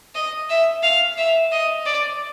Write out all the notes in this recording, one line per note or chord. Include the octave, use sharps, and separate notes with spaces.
D#5
E5
F5
E5
D#5
D5